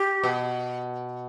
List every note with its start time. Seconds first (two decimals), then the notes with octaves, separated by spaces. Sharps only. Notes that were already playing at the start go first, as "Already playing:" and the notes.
Already playing: G4
0.24 B2